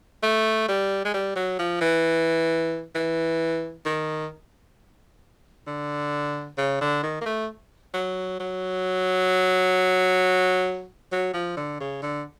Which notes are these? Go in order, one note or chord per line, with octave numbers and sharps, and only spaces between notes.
A3
G3
G#3
G3
F#3
F3
E3
E3
D#3
D3
C#3
D3
D#3
A#3
A3
F#3
F#3
F#3
F3
D3
C#3
D3